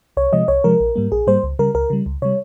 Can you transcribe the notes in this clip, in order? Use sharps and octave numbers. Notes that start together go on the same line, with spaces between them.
C2 C#5
C3 F3 G#3 D#5
C2 C#5
C3 F3 G#3 A#4
A#1
G#2 G3 A#3
A#1 G#4
G#2 G3 A#3 C5
C#2
C#3 G3 A#4
C#2 A#4
C#3 G3
C#2
C3 G3 C#5